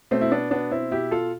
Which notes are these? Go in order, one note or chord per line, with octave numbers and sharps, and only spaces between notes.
B2 A3 C4
E4
B3 D4
B2 B3 D4
C4 E4
B2 E4 G4
F4 A4